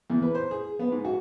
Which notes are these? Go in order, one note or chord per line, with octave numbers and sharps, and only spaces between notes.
E2
B4
C5
G#4
B3
G#2
F#4